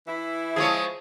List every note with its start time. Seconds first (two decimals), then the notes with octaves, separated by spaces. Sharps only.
0.07 E3 E4
0.56 F3 G#3 G#4 C#5